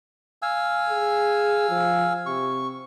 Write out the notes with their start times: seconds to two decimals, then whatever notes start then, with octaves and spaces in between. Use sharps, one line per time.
0.42 F5 G#5 E6
0.89 G#4
1.69 F3
2.26 C3 C#6